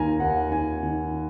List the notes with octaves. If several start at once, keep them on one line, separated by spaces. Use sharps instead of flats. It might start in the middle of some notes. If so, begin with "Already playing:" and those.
Already playing: D#2 D#3 G#5 A#5
D#2 F#5
D#3 G#5
D#3